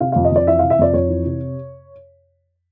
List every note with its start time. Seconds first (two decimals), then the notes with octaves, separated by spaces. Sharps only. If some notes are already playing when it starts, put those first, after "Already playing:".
0.01 C3 F5
0.12 F2 F5
0.25 D#5
0.32 F2 D5
0.47 E3 E5
0.59 C3 F5
0.70 E5
0.79 F2 D5
0.94 F2 C#5
1.09 E3
1.26 C3